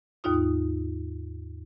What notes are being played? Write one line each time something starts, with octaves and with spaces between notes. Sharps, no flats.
D#2 G#2 D#4 F4 D#6